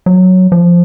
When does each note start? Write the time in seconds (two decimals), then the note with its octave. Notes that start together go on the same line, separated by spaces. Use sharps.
0.06 F#3
0.52 F3